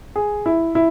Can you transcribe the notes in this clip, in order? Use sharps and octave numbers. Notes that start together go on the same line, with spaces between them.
G#4
E4
E4